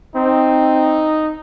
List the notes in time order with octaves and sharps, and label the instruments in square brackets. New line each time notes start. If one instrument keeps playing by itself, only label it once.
[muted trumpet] C4 [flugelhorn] D#4